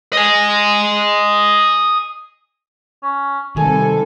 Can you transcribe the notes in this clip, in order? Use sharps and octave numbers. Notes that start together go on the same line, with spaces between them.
D#5 G#5
C#4
C3 D#3 G3 A4 G#5